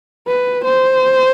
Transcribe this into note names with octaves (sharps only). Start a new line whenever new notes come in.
B4
C5